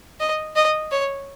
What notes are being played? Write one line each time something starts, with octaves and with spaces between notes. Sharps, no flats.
D#5
D#5
C#5